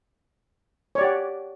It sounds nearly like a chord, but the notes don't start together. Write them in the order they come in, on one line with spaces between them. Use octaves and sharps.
C#5 D5 G4 F#5